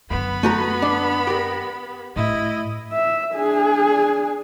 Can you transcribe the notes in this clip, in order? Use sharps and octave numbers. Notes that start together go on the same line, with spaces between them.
F#2 D3 B3 B5
A3 F#4 A#5
D4
G4 A#4
A2 E4 D#5
E5
D4 G#4